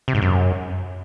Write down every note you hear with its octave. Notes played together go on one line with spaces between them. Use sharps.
C3
G#2
F#2